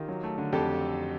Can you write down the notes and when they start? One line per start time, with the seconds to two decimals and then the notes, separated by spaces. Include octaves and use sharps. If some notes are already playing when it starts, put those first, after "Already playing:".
Already playing: D#3 F4 G4
0.08 F#3
0.23 A3
0.38 D3
0.53 F2 G4 A4